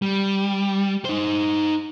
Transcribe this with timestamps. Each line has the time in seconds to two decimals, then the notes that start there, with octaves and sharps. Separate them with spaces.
0.02 G3
1.05 D#4 C5